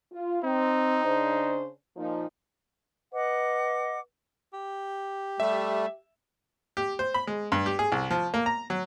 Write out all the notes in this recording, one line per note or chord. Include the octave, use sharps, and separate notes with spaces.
F4
C4 D#4
C#3 D4 C5
A#2 F3 D#4
B4 D#5 F#5 D6
G4
G3 A3 E5
G4
C5
B5
G#3
G2
G4
G#4
C2
F3
A#3
A#5
F#3